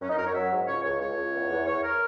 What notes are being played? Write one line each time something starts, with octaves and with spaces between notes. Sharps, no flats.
F#2 C#4
D#4
F#2 A#4
C#5
F#3 E5
G#2
C#2 C#5
C#2 C#5
C#2 C#5
C#2
E2
E2
E2 C#5
A#4